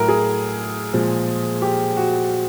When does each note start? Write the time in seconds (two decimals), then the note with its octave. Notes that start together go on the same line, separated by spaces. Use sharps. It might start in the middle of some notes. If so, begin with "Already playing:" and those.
Already playing: A2 F#3 A3 A#4
0.08 G#4
0.93 A#2 F3 G#3
1.62 G4
1.97 F#4